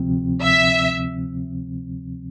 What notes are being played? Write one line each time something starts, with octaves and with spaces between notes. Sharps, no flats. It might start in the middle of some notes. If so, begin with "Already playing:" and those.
Already playing: D2 C3 F3 C4
E5